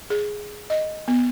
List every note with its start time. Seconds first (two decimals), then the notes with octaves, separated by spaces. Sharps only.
0.10 G#4
0.70 D#5
1.08 B3